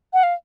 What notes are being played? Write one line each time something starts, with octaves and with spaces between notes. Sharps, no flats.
F#5
F5